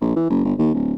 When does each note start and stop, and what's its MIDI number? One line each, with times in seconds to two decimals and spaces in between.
0.01 0.13 34
0.16 0.25 52
0.30 0.43 30
0.45 0.53 31
0.58 0.70 39
0.74 0.94 26